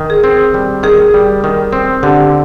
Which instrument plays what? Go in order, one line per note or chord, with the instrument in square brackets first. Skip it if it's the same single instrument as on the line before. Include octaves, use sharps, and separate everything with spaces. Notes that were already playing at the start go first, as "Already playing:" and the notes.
Already playing: [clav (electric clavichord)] D#3
[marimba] G#4
[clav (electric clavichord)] C4
G3
[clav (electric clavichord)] D#3 [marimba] G#4
[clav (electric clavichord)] G3
D#3
C4
[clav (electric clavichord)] D3 [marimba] G4